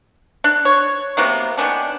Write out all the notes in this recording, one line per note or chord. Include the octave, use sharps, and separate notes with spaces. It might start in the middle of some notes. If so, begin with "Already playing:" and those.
D4
C#5
C3 F#3 A#3 B3
D#3 B3 C#4 D4